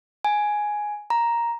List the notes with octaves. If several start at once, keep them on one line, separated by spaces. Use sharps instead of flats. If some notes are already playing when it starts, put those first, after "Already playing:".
G#5
A#5